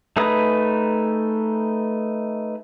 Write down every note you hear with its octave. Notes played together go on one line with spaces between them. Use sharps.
A3 D#4 G#4 B4 D#6